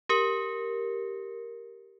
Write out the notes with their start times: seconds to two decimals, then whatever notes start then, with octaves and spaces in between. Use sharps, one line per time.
0.09 G4 A#4